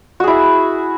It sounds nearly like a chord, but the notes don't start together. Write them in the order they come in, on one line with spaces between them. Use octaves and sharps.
F#4 G#4 E4